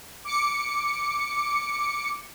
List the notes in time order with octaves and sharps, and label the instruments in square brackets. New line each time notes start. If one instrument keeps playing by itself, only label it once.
[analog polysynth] D6 C#7